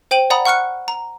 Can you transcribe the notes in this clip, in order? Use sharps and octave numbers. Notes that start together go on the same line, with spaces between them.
C5 G5 D#7 F#7
D5 F#5 A#5 B5 D#6
F#5 C#6 F6 F#6 C#7
A#5